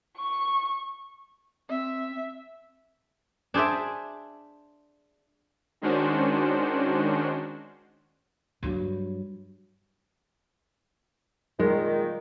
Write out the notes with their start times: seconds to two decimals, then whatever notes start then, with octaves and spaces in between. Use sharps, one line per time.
0.18 C#6
1.69 C4 E5
3.54 D4 G#4 C5 D5 E5
5.81 D#3 G#3 C#4 D4 F#4 C5
8.63 G2 F#3
11.59 A#2 D#3 G#3